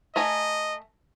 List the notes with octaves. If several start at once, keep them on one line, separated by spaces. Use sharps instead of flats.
A3 D#5 G#5 A#5